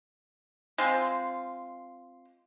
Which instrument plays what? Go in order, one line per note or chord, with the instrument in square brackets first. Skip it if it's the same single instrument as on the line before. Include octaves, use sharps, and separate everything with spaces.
[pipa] G#3 C4 F4